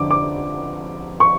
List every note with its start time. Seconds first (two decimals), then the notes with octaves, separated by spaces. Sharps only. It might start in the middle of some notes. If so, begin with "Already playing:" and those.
Already playing: F2 D3 D6
0.11 D6
1.20 C#6